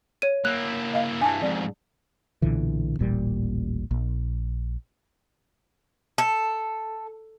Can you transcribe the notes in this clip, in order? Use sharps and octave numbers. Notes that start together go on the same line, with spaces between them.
C#5 D#7
A#3 E4 F#6
D#5 F5
G2 E3 G#5 A5
F2 G#2 D5
B1 A#2 D3 E3
D#1 A1 A#2 G3
A#1
A4